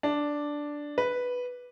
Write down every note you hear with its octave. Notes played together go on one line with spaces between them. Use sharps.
D4
B4